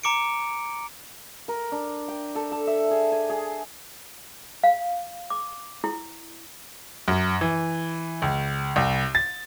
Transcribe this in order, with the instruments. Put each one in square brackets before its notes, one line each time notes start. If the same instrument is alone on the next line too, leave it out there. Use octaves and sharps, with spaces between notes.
[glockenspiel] A#5 D6 C#7 D7
[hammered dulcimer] A#4
D4
G5
A4
A4
E5
G#4
G#5
G#4
[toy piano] F5
D6
E4
[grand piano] F#2
E3
C#2
C2
A6